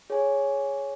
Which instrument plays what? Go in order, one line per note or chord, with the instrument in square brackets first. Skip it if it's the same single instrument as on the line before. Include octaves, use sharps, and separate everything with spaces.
[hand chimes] G#4 C#5 G#5